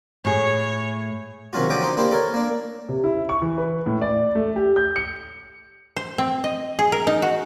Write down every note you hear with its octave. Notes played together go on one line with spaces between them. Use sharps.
A2 G#4 C#5
C3 D#3 F#3 C#4 F4 F#4
D3 F3 F#3 G5 D6 D#6
D4 D#4 C5
A#3 D4 E4 G4 C5
A4 A#4 C#5
A#3 D4
C3
E4
C#6
E3
B4
A2
D5
A3
G4
G6
C#7
C5
C4
D#5
G#4
A#4
D#4
F#4